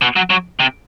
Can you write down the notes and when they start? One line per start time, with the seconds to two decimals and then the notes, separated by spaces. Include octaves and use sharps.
0.02 B2
0.16 F#3
0.30 F#3
0.60 C3